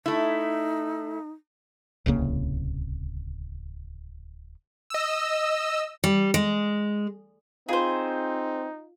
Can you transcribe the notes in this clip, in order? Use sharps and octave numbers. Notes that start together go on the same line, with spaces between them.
A3 D#4 E4
D1 C2 C#3 A#3
D#5 E6
G3
G#3
C4 D#4 F4 G#4 C5 F5